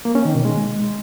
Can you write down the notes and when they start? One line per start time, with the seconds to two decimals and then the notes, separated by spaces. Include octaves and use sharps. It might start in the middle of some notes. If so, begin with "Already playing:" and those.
0.05 A#3
0.15 C#4
0.25 D#3
0.35 B2
0.45 G#3